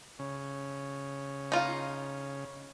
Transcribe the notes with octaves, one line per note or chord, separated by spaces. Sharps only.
C#3
D#4 F4